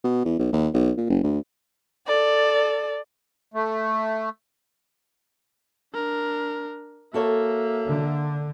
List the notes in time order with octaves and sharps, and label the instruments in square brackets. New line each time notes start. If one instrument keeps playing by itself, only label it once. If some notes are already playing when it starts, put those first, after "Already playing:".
[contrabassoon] B2
E2
B1
D#2
B1
A#2
F#1
D2
[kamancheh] A4 D5
[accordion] A3
[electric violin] D4 A#4
[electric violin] A#3 E5 [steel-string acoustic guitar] F#4 A4 C#5
[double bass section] D3